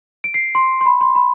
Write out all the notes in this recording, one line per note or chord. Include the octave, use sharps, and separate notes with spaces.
D7
C7
C6
C6
B5
C6
B5